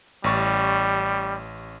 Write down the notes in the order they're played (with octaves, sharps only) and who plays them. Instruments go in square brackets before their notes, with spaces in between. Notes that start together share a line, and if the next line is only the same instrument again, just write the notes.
[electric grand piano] A1 C#6 A6 [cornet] G3